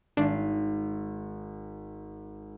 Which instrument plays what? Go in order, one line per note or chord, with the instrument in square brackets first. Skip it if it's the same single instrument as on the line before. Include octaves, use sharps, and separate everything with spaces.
[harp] G#1 C7 [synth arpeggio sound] D4